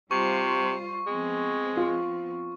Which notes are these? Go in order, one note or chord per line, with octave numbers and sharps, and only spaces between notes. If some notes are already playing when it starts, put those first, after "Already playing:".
C3 G3 F4 C5 C#6
F3 G#3 B3 C4
F4